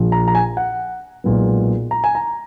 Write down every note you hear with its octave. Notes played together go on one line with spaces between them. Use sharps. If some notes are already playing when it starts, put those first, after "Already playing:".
Already playing: A#1 A#2 F3
A#5
A#5
G#5
F#5
B1 A#2 G#3 B3
A#5
G#5
A#5